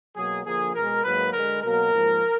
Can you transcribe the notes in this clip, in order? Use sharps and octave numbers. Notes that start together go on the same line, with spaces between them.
B2 F#3 A#3 G#4
D3 F3 A#3 G#4
B2 G#3 A#4
G#2 F#3 A#3 B4
D3 G#3 A#4
B2 F#3 A#3 A#4
G#2 F3 A#3